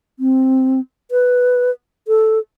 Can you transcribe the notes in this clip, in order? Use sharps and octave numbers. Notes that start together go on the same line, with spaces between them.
C4
B4
A4